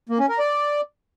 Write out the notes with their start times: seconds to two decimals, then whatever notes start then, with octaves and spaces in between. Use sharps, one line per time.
0.09 A#3
0.19 C#4
0.29 A#4
0.39 D5